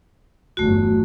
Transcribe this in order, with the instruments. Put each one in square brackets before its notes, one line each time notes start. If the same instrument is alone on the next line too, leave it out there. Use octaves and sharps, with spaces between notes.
[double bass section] G1 E2 F#3 [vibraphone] A3 F#4